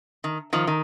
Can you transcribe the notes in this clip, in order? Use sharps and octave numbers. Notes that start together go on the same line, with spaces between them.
D#3
D#3 F3
D#3